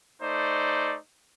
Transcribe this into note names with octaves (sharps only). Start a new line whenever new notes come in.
A3 D#4 C5 D5